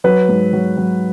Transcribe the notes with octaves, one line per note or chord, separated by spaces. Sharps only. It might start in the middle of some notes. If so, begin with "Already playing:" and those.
F#3 B4
G#2
F#3
F#3